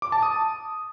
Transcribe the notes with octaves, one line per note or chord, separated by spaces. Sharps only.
D6
A5
D#6